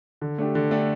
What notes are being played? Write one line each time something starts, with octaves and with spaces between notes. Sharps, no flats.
D3
A3 D4 G4
D3
A3 D4 G4